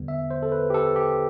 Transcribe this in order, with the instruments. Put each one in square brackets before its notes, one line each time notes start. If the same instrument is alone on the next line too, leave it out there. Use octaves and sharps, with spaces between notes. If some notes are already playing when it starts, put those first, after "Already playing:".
Already playing: [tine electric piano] E2 D3 G3 B3
E5
C5
A4
B4
G4
A4
G4